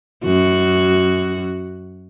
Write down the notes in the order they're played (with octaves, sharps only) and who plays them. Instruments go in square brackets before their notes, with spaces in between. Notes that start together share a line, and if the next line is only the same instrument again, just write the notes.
[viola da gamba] F#2 F#4